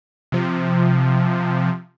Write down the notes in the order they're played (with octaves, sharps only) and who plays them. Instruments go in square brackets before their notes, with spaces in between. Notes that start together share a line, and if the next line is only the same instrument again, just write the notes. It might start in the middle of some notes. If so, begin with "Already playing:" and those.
[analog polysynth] C3 F3